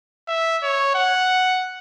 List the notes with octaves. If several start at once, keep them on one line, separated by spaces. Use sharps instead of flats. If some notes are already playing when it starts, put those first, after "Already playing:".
E5
C#5
F#5